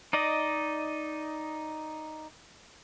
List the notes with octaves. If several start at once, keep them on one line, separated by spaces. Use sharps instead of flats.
D#4 D5 D#5